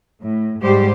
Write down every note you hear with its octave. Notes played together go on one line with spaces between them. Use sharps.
A2
G#2 G3 G4 C5